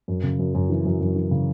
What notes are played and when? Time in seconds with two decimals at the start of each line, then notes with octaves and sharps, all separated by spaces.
0.08 F#2
0.23 C#3
0.39 F#2
0.55 F#2
0.70 E3
0.85 F#2
1.01 F#2
1.16 E3
1.31 C#3